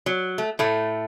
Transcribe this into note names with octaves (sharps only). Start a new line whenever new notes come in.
F#3
A3
A2 A3